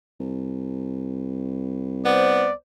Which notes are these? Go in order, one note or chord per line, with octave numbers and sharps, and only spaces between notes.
C2
B3 C5 D5